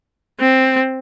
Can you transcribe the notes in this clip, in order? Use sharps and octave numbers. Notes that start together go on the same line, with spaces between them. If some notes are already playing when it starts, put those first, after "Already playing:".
C4